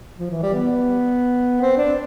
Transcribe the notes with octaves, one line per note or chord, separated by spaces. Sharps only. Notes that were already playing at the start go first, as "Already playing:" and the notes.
F3
E3
G3
B3
C4
D4